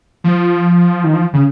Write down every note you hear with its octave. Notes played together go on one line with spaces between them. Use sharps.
F3
D#3
F3
C#3